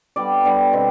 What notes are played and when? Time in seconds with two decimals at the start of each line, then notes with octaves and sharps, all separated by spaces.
0.16 D3 G3 B3 D5
0.44 D3 G3 B3
0.72 B2 G3 C4